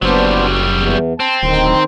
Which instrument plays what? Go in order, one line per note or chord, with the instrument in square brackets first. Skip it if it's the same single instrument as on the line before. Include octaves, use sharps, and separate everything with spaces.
[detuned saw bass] F#1 [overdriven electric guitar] F#3 G3 [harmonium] B3 D4 C5
[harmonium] E2
[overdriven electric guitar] C4 [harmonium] A5
[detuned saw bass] D1 [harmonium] D#3 C5